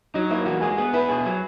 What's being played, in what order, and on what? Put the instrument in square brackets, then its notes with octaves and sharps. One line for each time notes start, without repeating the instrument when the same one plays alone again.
[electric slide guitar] F#3 [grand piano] D#4
[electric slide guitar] A#3 [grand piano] E4
[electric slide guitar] E3 [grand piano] F#4
[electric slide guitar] G#3 [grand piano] G#4
[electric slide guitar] B3 [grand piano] G#4
[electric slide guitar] E4 [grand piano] B4
[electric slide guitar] B2 [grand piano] G#4
[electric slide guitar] F#3